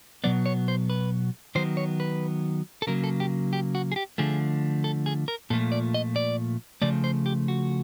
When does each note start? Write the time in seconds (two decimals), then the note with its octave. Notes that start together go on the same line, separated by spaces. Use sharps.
0.24 B2 F#3 B3 D5
0.46 C#5
0.68 C5
0.90 B4
1.55 D#3 F#3 B3 C5
1.77 C#5
2.00 B4
2.82 A4
2.87 C#3 F#3 A#3 A#4
3.04 A4
3.20 G4
3.53 G4
3.75 F#4
3.92 G#4
3.96 G4
4.18 D3 F3 A3 G#4
4.84 A4
5.06 G#4
5.28 A#4
5.50 A#2 F3 A3 A4
5.72 D5
5.94 D#5
6.16 D5
6.82 C#3 F3 A3 D5
7.04 C5
7.26 G4
7.48 F#4